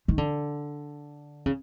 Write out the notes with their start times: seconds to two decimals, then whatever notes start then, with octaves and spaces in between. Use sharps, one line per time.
0.08 D#3
0.18 D3
1.46 C#3